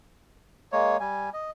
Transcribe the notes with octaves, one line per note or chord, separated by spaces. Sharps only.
G#3 A#3 C#5
G3 G#5
D#5